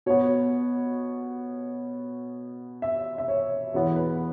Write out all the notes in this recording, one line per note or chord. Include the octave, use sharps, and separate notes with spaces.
B2 B3 C#5
E5
E5
C#5
E2 B2 B3 C#5
B4